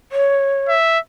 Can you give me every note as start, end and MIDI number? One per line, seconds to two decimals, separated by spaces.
0.12 0.73 73
0.69 0.99 76